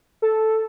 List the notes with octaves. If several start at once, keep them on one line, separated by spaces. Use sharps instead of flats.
A4